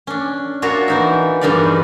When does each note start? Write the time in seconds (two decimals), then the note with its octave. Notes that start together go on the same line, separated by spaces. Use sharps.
0.07 C#4 D4
0.62 D4 F4 F#4 A#4 C#5 E5
0.88 E3 D#4 E5
1.41 E2 G2 D#4 A#4 B4 D5